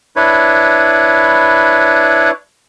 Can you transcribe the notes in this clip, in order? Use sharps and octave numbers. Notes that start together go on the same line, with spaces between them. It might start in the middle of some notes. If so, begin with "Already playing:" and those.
D4 E4 B4 C#5